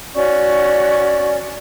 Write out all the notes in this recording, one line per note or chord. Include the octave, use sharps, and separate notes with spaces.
C#4 F#4 D5 C#6